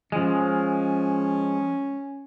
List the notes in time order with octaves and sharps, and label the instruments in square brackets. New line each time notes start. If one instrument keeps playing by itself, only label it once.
[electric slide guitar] F3 G#3 [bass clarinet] C#4